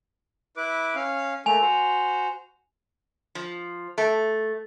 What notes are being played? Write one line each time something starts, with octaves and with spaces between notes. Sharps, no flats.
E4 B4 D6
C#4 F5
A3 A#3 G#5 F7
F#4 C5
F3
A3